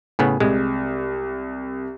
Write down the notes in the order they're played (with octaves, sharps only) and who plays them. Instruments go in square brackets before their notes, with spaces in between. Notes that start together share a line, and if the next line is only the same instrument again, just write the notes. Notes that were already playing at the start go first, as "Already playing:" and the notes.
[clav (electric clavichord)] A2 C#3 B3 [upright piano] G#5
[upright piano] C2 [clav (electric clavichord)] G#3